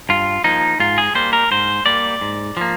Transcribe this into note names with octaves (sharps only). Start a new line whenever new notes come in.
G2 F4
F3 A#3 D#4
G#2 F4
G#4
G3 A#3 C5
A#4
G#2 C5
G3 A#3 D5
G#2
F3 A#3